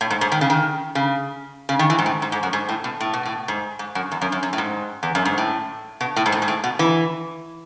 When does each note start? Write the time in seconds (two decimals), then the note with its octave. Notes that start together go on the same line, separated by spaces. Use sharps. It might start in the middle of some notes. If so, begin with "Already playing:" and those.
0.01 A2
0.10 G#2
0.21 G#2
0.32 D#3
0.41 C#3
0.50 D#3
0.95 C#3
1.69 C#3
1.79 D#3
1.90 E3
1.99 G#2
2.06 A2
2.22 G#2
2.32 G#2
2.43 F#2
2.53 G#2
2.69 A2
2.84 B2
3.00 A2
3.13 B2
3.25 A2
3.48 G#2
3.79 G#2
3.95 F#2
4.11 E2
4.21 F#2
4.32 F#2
4.43 F#2
4.53 A2
4.58 G#2
5.03 E2
5.15 F#2
5.25 G#2
5.38 A2
6.01 B2
6.16 A2
6.26 G#2
6.32 A2
6.42 G#2
6.48 A2
6.64 B2
6.79 E3